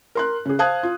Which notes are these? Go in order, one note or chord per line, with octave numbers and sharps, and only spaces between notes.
A#4 C6 F#6
C#3 G#4
C5 F5 A5 D#6 F#6 G#6
F4